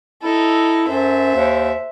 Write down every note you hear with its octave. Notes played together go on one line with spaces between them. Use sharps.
D#4 E4 A4
F#2 C5 E5
D#2